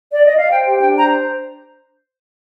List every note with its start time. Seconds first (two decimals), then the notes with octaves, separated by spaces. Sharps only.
0.12 D5
0.24 D#5
0.37 F5
0.50 C5 G5
0.65 G4 G5
0.80 D4 G5
0.96 C5 A#5